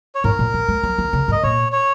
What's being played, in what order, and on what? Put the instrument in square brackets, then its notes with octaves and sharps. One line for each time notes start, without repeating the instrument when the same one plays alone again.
[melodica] C#5
[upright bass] G#2 [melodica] A#4
[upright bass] A#2
D#3
G#3
F#3
D#3
C#3
G#2
[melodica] D#5
[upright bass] A#2 [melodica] C#5
[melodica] C#5